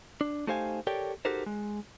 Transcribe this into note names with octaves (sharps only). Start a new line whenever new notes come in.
D4
A3 D#4 G4 C5 F5 G#5
G4 A4 A#4 C#5 D5 G5
D#4 F#4 G4 A4 A#4 C5
G#3